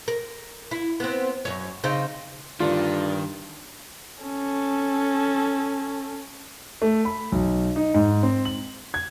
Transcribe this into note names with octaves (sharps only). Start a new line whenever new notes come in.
A#4
E4
B3 C4
F#2 C#5
C#3 C4 D#4
G2 D3 D#3 D4 F4
C#4 A4
A3
B5
B1
D#4
G#2
C4
F#7
G#6